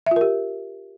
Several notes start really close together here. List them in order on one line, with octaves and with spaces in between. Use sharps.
E5 F4 A#4 G4